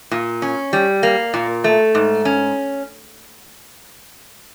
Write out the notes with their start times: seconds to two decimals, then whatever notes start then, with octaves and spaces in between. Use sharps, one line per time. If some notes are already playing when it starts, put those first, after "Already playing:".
0.11 A#2
0.42 C#4
0.73 G3
1.03 A#3
1.34 A#2
1.64 A3
1.95 G#2
2.25 C#4